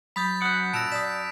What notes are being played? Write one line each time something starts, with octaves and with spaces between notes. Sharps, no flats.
F#3 B5 D#6 G6 A6 B6
F#2 F#5 D#6 F#6
A#2 A5 E6 A#6 D7 E7 F7
D5 D#6 B6 E7